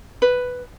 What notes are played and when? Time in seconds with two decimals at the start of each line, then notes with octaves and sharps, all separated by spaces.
0.22 B4